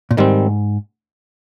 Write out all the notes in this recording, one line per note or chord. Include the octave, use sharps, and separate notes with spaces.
A#2
G#2 D#3 G3 C4